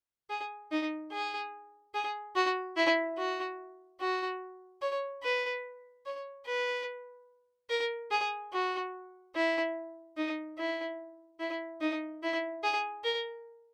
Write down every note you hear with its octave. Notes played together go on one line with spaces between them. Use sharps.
G#4
D#4
G#4
G#4
F#4
E4
F#4
F#4
C#5
B4
C#5
B4
A#4
G#4
F#4
E4
D#4
E4
E4
D#4
E4
G#4
A#4